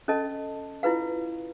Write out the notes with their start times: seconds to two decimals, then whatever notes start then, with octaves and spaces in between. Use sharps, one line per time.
0.08 C#4 A4 D#5 A5
0.83 E4 F4 B4 F5